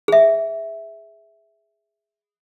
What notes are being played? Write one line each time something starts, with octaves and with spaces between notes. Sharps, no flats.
G#4 E5